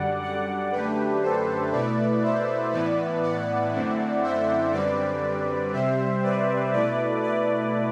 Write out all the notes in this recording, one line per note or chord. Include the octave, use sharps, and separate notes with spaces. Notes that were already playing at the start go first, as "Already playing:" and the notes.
Already playing: F#2 D3 G3 D5 F#5
D5 F#5
F#2 D3 A3 D4 G4 B4
A4 C5
B2 A3 E4 B4 D5
C5 E5
A2 E3 B3 E4 B4 D5
D5 F#5
F#2 D3 A3 C4 E4
C5 E5
F#2 D3 G3 C4 B4 D5
C3 G3 C4 C5 E5
B4 D5
B2 A3 E4 B4 D5
B4 D5